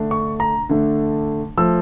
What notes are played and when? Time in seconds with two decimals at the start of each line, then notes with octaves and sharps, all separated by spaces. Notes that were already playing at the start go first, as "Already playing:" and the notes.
Already playing: D3 A3 D4
0.11 C#6
0.40 A#5
0.69 D3 A3 D4
1.57 F3 A3 E6